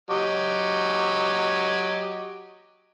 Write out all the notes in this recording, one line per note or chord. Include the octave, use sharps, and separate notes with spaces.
F#3 G4 D#5